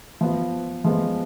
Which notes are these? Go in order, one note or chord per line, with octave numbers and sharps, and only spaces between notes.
F3 B3 F4
F3 G#3 B3